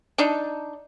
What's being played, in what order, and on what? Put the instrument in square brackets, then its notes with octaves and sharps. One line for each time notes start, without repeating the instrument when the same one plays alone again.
[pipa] D4 D#4